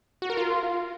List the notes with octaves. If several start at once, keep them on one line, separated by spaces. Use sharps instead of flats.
F#4
A#4
F4